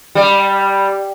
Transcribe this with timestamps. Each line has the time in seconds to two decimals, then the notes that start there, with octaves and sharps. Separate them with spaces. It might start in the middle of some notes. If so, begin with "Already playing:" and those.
0.15 G3